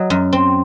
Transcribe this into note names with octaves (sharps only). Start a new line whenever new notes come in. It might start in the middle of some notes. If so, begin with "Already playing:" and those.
Already playing: F#3 D#5
F#2
C4